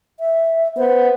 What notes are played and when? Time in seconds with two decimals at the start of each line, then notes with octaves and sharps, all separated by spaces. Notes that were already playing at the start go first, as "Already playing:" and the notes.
0.20 E5
0.77 B3 C5